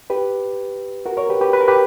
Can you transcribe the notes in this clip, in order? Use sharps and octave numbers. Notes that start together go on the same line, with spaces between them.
G4 B4
F#4 A#4
A#4 C#5
G4 B4
G4 B4
B4
A#4
G4 B4